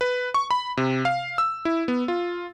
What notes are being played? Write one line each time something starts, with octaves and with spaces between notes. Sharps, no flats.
B4
C#6
B5
C3
F5
E6
E4
B3
F4